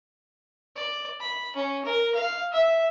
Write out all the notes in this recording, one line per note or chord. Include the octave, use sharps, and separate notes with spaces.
D5
B5
C#4
A#4
F5
E5